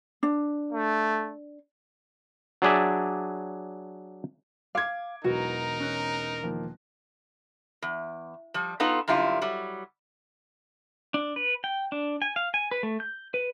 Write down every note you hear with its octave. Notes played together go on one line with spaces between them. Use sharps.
D4
A3
F#3 D4 G#4 D5 E5
F5 D6 G#6
E1 E3 F#3 D#4 F#4 A#4
C#4 F#6
D#3 F3 A#3
E2
F3 G3
B3 D#4 F4 A4 B4
F#2 D3 G3 E4 F4
F#3 G3
D4
B4
G5
D4
G#5
F5
G#5
B4
A3
G6
B4